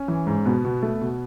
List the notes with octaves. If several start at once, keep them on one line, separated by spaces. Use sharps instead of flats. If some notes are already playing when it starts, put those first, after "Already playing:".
Already playing: C#4
E3
G#2
B2 B3
B2
A3
B2